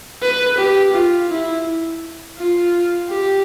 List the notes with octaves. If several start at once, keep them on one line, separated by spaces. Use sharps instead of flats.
B4
G4
F4
E4
F4
G4